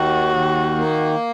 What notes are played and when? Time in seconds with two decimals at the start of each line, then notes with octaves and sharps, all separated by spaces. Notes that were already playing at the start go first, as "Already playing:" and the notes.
Already playing: D#2 D#3 F#4
0.36 D#3
0.78 A#3